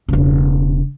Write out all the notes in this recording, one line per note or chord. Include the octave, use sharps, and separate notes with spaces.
E1 C#3